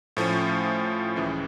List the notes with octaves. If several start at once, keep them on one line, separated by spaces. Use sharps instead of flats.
A2 F3 A3 C#4
C#2 C#3 E3